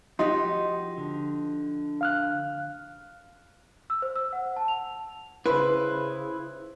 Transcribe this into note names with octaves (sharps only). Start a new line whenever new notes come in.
F3 D#4 F#4 G4 C6
D3
F5 F6 F#6
E6
C5
E6
F#5
A5
F7
C#3 E4 B4 C5